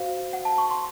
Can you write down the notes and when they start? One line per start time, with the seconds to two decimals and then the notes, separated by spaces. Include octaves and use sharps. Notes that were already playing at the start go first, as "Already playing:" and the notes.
Already playing: F#4 C5 F5
0.33 F#5
0.45 A5
0.58 C#6
0.71 C6